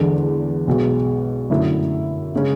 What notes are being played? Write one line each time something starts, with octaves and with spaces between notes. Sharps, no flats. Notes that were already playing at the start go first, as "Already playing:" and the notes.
Already playing: E2 D3 G#3 D4
B1 B2 G#3
F#2 D3 A3 E4
C#3 G#3 C#4